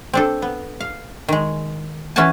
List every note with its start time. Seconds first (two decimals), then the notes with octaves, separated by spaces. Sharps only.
0.13 C4 D4 A4
0.42 B3
0.81 F5
1.28 D#3 G#3
2.16 E3 C#4 F#4 F#5 G#5 A5